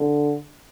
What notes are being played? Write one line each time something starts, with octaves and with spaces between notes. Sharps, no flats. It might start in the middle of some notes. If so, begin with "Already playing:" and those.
Already playing: D3